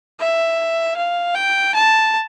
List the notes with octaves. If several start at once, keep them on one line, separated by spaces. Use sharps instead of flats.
E5
F5
G5
A5